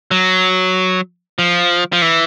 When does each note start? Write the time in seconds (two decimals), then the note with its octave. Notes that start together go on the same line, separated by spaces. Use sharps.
0.11 F#3
1.39 F3
1.93 F3
2.02 E3